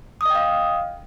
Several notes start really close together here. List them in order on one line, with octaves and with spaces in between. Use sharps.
D#6 D#5 G5 F5